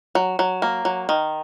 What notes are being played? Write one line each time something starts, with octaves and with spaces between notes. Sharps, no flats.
F#3
F#3
A#3
F#3
D#3